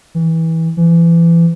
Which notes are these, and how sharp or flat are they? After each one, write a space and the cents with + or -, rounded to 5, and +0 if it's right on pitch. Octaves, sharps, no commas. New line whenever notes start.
E3 -20
E3 +30